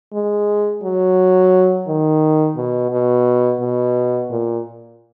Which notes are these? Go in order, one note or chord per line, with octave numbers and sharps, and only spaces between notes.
G#3
F#3
D#3
B2
B2
B2
A#2